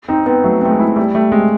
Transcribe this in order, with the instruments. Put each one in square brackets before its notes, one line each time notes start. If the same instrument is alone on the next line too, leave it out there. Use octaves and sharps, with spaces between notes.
[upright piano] C4 [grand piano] D#4
[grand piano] B3 [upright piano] C4
[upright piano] F#3 [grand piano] A3
[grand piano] A3 [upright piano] C4
[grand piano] G#3
[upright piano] E4
[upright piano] G3 [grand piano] A3
[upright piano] G3 [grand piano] A3
[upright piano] C3 [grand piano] G#3